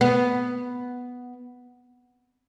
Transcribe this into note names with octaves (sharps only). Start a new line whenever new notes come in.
B3